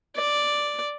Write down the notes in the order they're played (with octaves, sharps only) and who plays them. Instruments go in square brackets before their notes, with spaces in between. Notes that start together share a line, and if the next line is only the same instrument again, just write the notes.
[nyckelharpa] D5